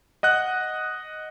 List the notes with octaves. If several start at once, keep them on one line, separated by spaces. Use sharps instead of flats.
D#5 F#5 F#6